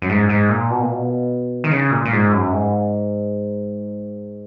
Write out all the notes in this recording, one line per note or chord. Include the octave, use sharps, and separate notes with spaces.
F#2
G#2
G#2
A#2
B2
A#2
B2
D#3
C#3
A#2
A#2
G#2
F#2
G#2